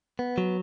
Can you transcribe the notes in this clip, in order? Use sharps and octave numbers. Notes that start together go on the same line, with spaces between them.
B3
F#3